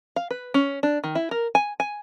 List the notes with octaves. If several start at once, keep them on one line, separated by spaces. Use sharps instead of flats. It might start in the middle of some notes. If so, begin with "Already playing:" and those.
F5
B4
C#4
D4
D#3
E4
A#4
G#5
G#5